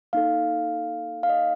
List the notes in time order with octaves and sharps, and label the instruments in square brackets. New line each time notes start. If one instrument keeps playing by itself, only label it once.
[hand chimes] A#3 D#4 A4 F5
F5
D#5